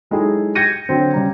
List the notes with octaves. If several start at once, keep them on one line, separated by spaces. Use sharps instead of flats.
F#3 G#3 D#4 E4 G#4 A4
G6 G#6 A#6 C#7 D#7
D3 F#3 C4
C#3 G3 A#5